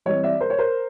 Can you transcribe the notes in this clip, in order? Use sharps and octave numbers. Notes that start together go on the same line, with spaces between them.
E3 G3 C4 C#5 D#5
D5 E5
A#4 C5
C#5
A#4 C5